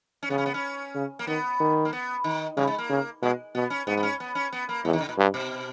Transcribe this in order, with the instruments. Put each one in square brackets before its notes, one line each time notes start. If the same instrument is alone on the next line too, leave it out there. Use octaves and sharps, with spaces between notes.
[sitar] C#4
[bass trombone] C#3 [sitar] B3
[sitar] C#4
B3
C#4
[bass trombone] C#3
[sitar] A#3
[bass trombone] D#3 [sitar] B3
[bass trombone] D#3
[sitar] A#3
B3
D#3
[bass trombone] C#3 [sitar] G3
[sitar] G#3
A#3
[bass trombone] C#3
[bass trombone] B2 [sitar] G#3
[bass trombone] B2 [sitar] B3
[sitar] C#4
[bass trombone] G#2 [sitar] B3
[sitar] B3
C#4
B3
C#4
B3
A#3
[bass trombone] E2 [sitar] G#3
[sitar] D#3
C#3
A#2
[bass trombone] G2
[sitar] B2